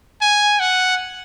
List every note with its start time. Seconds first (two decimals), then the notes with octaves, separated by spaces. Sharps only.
0.22 G#5
0.60 F#5